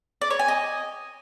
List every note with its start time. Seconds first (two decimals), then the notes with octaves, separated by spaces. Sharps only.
0.22 D5
0.30 C#5
0.39 G#5
0.48 D#5